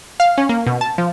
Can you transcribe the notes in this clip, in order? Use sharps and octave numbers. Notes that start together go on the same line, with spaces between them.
F5
C#4
A#3
B2
A5
F3